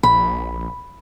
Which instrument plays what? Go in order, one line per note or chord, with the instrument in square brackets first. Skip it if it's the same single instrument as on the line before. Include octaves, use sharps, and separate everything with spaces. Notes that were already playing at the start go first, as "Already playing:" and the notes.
[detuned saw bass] A#1 [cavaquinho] B5